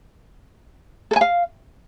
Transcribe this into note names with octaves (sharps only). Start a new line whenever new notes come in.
A4
G#5
F5